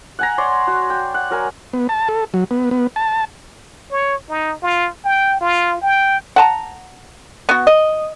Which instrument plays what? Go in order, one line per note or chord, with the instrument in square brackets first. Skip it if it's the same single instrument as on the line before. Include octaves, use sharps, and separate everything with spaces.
[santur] F#5 G#5 A#5
C#5 D5 C6
F#4
G5
F#5
F#3 A#4 G#5
[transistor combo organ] B3
A5
A4
F#3
B3
B3
A5
[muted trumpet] C#5
D#4
F4
G5
F4
G5
[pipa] F#5 A5 A#5
B3 F#4
D#5